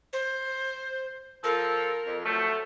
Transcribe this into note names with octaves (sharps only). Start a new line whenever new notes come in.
C5
F3 F4 A4 A#4
F2
F3 F#3 A3